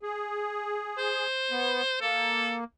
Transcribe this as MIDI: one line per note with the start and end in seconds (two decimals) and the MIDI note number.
0.03 1.27 68
0.98 1.98 72
1.51 1.82 59
2.01 2.64 58
2.01 2.55 69